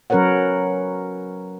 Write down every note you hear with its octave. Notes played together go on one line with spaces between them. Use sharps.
F#3 C#4 A#4 B4 C#5 F#5